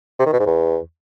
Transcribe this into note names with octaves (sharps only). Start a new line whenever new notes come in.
C3
D#3
B2
G#2
E2